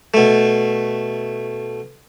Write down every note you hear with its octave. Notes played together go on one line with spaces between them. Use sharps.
B2 A3